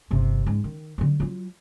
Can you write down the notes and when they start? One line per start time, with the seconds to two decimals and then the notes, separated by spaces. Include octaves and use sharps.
0.11 G1 C3
0.46 G#2 G#3
0.64 D#3
0.98 D3 F#3
1.20 F#3 F4